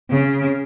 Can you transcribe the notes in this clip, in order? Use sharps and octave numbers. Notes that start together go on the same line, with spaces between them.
C#3